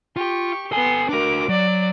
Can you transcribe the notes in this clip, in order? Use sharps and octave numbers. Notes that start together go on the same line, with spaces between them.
F4 G4 C#6
B3 A4 G#5 C6
D4 F#4 A#4 D6
F#3 D5